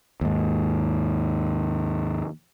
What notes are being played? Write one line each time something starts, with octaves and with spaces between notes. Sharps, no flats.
D#2 G#2